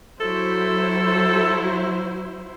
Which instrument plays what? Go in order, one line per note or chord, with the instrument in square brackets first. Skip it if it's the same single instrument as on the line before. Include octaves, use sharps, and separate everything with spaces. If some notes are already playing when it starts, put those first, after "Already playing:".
[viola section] F#3 E4 C5 [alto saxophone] A4